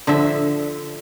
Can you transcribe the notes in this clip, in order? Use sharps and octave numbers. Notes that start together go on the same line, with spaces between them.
D3 F3 E5